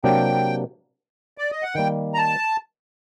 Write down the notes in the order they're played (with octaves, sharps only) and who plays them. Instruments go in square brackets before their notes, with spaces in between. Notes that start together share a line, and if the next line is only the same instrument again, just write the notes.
[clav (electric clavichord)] C3 F#3 A#3 D4 G4 [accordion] G5
[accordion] D5
D#5
F#5
[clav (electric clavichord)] D#3 G3 A#3 [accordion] G5
[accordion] A#5
A5